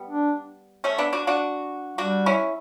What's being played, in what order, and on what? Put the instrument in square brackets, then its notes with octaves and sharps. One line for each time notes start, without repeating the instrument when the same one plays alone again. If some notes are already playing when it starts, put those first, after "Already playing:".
Already playing: [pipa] G3 B3
[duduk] D4
[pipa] A3 C#4
B3 D4
D4 F#4
D4 F#4
[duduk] G3 [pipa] D4 F#4
[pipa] C#4 E4